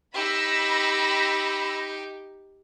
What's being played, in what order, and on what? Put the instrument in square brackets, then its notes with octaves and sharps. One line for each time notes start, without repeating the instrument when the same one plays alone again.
[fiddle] D#4 G4 [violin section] B5 E6 A#6